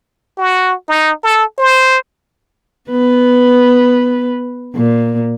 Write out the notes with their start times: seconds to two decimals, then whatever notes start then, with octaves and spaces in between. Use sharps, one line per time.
0.38 F#4
0.88 D#4
1.24 A4
1.58 C5
2.90 B3 B4
4.75 A#2